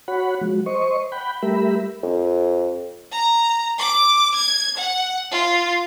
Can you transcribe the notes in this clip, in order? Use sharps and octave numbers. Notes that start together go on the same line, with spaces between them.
F#4 C#5 F#5 B5
F3 G#3 F#4
C5 D#5 C#6
F#5 G5 B5
G3 A3 G4 A#4 E5 B5
F2
A#5
D6
G#6
F#5
F4